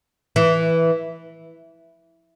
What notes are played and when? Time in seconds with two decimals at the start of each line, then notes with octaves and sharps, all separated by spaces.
0.36 E3